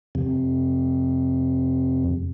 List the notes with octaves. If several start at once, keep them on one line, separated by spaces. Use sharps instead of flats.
F2 C3